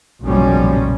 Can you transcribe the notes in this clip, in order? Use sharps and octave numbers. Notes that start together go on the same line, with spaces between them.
F#1 B1 A#2 F3 G3 C#4